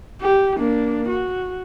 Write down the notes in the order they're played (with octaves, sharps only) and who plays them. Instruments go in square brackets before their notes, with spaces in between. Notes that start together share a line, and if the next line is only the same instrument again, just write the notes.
[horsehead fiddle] G4
A#3 D4
F#4